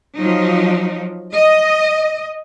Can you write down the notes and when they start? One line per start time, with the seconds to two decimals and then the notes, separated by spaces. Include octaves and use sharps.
0.16 F3 F#3 D#4
1.35 D#5